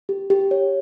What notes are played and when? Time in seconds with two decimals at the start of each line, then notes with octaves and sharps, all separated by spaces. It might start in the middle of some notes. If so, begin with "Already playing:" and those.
0.09 G4
0.30 G4
0.51 C#5